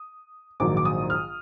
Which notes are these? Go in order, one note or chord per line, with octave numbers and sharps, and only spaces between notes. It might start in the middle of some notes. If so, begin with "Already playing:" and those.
Already playing: D#6
A#1 G#2 D#3 F#3 D6
D6
D#6
F6